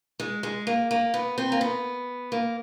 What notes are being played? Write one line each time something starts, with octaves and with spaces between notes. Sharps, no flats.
G#3
G#3
A#3
A#3
B3
C4
A#3
B3
A#3